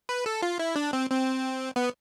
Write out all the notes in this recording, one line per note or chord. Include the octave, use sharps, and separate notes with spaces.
B4
A4
F4
E4
D4
C4
C4
B3